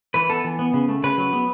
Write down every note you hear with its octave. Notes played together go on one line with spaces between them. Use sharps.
E3 B4
B3 A4
E3
B3
C#3
A3
C#3 B4
F#3
B3